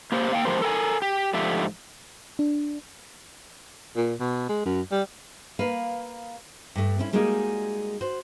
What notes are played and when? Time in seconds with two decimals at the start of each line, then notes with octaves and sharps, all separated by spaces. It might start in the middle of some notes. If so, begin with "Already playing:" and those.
0.12 A#3 G4 C5
0.32 A#3 F5 G5
0.45 G#2 D#3 F3 A#3 G4 C5
0.62 A4 A#4 G5 G#5
1.02 G4
1.34 G#2 D3 F3 A3 G4 E5
2.39 D4
3.96 A#2
4.20 B2
4.49 G#3
4.65 F#2
4.91 G3
5.59 A#3 B4 F5
6.76 G2 A3
6.98 C4 C#4 E4
7.13 G3 G#3 A#3 D#4 F#4 G#4
8.01 F#4 C5